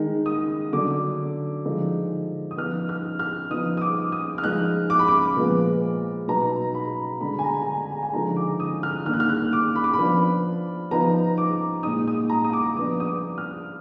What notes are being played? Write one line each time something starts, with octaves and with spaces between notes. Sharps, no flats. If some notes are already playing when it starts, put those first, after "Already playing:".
Already playing: D#3 G#3 D#4
D#6
D3 F#3 D4 D6
D3 F3 G#3 D#4
D#6
F3 B3 D#4 F6
F6
F6
F3 B3 D#4 D#6
D#6
D6
D#6
F6
F3 G#3 D#4 F#6
D6
B5
D6
A#2 F3 G#3 B3
B2 F#3 B3 D#4 A#5
B5
D3 G#3 D4 B5
G#5
A#5
A#5
G#5
G#5
G#5
D3 F3 G#3 D#4 A#5
D6
D#6
F6
D#3 A#3 D4 F6
F#6
F6
F#6
D6
B5
D6
B5
F3 B3 D4
F3 B3 D#4 A#5
D6
A#2 G#3 D#4 D#6
D#6
A#5
D#6
D6
F3 B3 D4 D#6
D#6
D6
F6